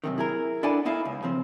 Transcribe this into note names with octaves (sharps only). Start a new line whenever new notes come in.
F#2 C3 D#3
E4 G#4 A#4
D4 E4 A4 D5 F#5 G#5
B3 D#4 E4 F5 G#5
C#2
C#3 F3 C4